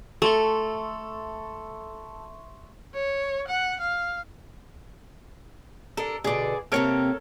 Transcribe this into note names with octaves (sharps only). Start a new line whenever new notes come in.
A3 A4 E5 C6 C#6
C#5
F#5
F5
D4 A4 A#4
B2 D3 G#4 D5
C3 A#3 C4 A4 A#4 C#5